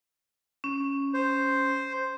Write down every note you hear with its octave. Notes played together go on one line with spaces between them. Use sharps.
C#4
C5